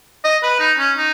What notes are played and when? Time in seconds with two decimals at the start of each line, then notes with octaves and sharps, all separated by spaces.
0.24 D#5
0.43 B4
0.60 D#4
0.79 C#4
0.97 D#4